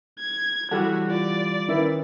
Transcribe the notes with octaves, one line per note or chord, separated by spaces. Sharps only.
G#6
E3 G3 F#4 G4 A4 F#5 A5
F4 D5
D#3 C#4 E4 A#4 B4 E5